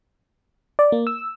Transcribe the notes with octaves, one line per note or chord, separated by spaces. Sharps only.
D5
A#3
E6